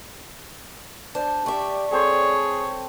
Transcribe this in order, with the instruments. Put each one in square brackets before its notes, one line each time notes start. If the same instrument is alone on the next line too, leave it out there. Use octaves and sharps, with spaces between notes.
[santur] D4 A5 [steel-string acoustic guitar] C5
[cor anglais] G4 [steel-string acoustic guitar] D5 E5 [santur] C#6
[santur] C4 A4 C5 [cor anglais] G#4 [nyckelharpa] C#5